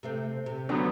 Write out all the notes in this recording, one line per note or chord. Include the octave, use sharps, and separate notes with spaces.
C3 A3 C4
C3
F2 D3 F#3 B3